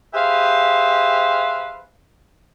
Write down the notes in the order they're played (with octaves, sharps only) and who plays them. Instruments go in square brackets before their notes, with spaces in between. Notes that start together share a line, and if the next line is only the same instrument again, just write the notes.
[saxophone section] G4 G#4 B4 C5 E5 F5